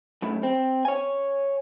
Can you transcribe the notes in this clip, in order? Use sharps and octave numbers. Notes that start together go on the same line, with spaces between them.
F#2 A2
C4
C#5 G#5